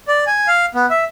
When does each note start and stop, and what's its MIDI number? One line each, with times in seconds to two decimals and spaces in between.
0.08 0.24 74
0.27 0.48 80
0.48 0.65 77
0.75 0.86 59
0.90 1.04 76